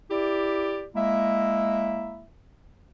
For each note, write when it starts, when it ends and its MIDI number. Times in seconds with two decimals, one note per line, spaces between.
0.11 0.86 64
0.11 0.86 67
0.11 0.86 74
0.96 2.24 56
0.96 2.24 58
0.96 2.24 64
0.96 2.24 76